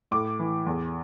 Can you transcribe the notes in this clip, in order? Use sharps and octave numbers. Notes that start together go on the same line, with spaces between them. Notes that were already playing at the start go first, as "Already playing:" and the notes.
A2 D6
E3
E2